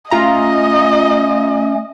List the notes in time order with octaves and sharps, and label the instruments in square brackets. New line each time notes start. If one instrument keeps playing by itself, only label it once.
[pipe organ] A3 C#4 [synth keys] F4 A#5 [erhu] D#5